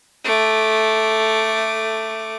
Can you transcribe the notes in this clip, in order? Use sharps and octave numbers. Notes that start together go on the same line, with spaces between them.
A3 D6